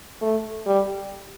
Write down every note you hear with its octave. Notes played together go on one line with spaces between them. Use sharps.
A3
G3